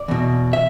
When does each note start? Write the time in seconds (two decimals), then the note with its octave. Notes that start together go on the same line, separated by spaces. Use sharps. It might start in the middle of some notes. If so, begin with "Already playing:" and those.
Already playing: D5
0.08 E2 B2
0.53 E5